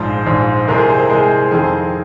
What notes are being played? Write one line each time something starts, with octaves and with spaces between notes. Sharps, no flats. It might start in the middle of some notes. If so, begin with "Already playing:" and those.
Already playing: A#1 G#2 F3 G#3 C5
A#1 G#2 F3 G#3
C2 C3 G#3 C4 A#4
G#4
C5
A#4
C2 C3 G#3 C4 G#4
F2 D#3 C4 G#4